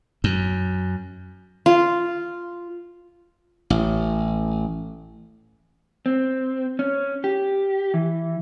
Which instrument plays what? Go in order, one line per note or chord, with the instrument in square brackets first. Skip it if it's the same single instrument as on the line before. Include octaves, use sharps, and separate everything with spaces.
[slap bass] F#2
[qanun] F4
[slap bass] A1
[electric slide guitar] C4
C#4
G4
E3